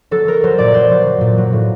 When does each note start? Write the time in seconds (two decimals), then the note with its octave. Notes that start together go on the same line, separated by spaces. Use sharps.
0.11 F#3 A4
0.28 F#3 A#4
0.43 F#3 C5
0.58 A#2 D5
0.74 F#3 C5
0.90 F#3
1.06 F#3
1.21 A#2
1.38 F#3
1.53 A2